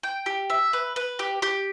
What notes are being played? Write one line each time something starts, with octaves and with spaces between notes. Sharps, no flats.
G5
G4
E5
B4
B4
G4
G4